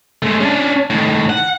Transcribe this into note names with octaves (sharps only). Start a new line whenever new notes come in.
G#3 A3
C#4 D4
A2 D#3
F#5